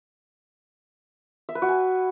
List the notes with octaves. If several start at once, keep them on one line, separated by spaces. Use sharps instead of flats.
E5
B4
F#4
G#5